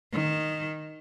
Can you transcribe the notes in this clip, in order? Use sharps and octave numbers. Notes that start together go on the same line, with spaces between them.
D#3